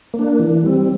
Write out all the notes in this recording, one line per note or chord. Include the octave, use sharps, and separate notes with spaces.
A#3
D4
E3
G3 C4